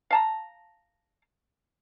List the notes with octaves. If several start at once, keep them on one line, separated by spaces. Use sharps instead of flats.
F5 A5 A#5